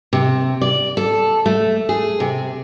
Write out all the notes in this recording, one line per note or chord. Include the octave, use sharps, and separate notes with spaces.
C3
D5
A4
A3
G#4
C3